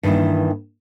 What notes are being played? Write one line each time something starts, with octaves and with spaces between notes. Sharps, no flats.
G2 D#3 E3 A#3 E4